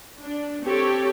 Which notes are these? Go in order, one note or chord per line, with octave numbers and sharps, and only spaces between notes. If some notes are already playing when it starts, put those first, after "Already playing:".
D4
C4 G4 A4 C#5